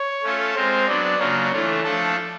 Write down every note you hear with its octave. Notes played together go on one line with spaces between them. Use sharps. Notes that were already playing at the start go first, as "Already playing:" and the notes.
Already playing: C#5
A3 C#4 F4 A4
G#3 C4 F4 A#4 C5
F#3 B3 D4 D5
C#3 F#3 A#3 D4 F4 C#5
E3 A3 D4 F4
F3 A3 D4 F4 A4